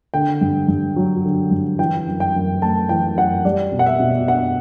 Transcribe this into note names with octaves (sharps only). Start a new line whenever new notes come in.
D3 G5
G2
G2
F#3
D3
G2
E3 G5
F#2
G5
F#2
A3 A5
E3 G5
F#2 F#5
G3 D5
B2
F#5
E5
B2
D4 F#5